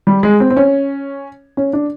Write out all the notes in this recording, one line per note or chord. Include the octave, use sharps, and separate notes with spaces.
G3
G#3
C4
C4
C#4
C#4
D4